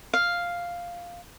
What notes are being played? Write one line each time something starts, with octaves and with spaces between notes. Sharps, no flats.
F5